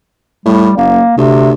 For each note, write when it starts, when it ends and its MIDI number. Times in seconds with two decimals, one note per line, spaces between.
0.46 0.70 45
0.46 0.74 55
0.77 1.02 30
0.77 1.16 58
1.17 1.54 38
1.17 1.52 48